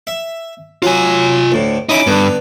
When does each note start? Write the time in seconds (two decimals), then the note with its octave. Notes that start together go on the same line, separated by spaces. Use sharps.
0.07 E5
0.82 F#3 C#4 F4 G#5
1.52 D2 A2
1.89 C#4 D#4 E4 B5 D6
2.07 G2 D3 B3